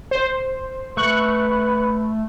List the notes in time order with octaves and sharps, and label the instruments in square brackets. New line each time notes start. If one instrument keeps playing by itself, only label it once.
[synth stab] C5
[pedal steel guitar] A3 [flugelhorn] B4 [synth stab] C#6 F#6